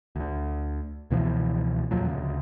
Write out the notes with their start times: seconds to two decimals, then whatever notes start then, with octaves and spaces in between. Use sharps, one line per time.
0.16 D2 D3
1.10 C#2 B2 E3 F3
1.91 E2 A#2 F3 F#3
2.07 D2 C#3